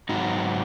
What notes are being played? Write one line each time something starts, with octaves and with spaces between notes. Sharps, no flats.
G#2 F#3 D#4 F#4